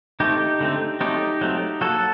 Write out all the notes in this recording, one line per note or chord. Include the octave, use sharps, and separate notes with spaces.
D#3 A3 C4 D#4 G4
D3 A3 C4
F#3 A3 C4 D#4 G4
F#3 A3 C4
F#3 A#3 F#4 A4